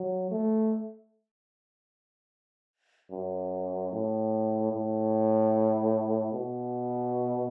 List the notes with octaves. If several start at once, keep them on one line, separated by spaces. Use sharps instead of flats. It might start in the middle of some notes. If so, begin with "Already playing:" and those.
Already playing: F#3
A3
F#2
A2
A2
B2